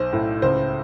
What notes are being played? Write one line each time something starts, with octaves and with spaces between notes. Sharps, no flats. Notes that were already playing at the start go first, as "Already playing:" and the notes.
Already playing: B1 C5
A2
C#2 C5